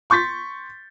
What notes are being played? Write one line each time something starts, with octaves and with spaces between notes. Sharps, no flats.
C6 C#6 G6 A6 B6